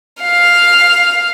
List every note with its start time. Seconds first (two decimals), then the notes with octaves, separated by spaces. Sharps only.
0.21 F5